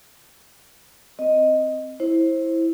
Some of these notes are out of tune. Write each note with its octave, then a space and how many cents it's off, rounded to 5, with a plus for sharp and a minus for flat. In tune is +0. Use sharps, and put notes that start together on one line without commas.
C4 +0 D#5 +0
E4 -5 C5 +20